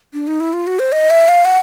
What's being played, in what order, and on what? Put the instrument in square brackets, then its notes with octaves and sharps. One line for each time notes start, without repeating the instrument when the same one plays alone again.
[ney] D4
D#4
E4
F4
F#4
C5
D#5
E5
F5
F#5